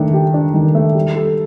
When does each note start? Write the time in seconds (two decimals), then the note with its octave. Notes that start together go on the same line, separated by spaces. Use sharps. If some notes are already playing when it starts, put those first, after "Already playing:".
Already playing: D#3 A3 D4
0.13 G4
0.34 D4
0.54 D#3
0.75 A3
0.95 G3
1.16 A4